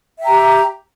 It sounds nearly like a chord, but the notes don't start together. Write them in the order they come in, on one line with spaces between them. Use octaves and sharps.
E5 G5 A#5 G4